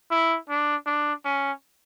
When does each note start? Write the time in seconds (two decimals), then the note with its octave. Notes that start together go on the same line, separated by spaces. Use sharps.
0.11 E4
0.49 D4
0.86 D4
1.25 C#4